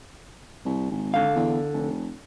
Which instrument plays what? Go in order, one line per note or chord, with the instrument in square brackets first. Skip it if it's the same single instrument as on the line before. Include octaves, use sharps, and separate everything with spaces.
[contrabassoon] C2
G#1
[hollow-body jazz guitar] D3 F5
[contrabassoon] E2
F1